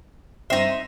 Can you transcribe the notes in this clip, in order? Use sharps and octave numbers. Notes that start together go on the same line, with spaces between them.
G2 C4 D#4 E5 C6